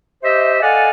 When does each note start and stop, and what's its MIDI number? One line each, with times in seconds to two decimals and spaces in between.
0.23 0.62 67
0.23 0.62 72
0.23 0.62 75
0.23 0.62 76
0.62 0.90 69
0.62 0.90 74
0.62 0.90 75
0.62 0.90 77
0.62 0.90 78
0.62 0.90 80